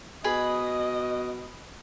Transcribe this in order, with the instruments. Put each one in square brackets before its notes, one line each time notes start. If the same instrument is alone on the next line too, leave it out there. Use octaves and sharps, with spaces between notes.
[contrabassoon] B2 [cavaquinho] G#4 B4 B5 [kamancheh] D#5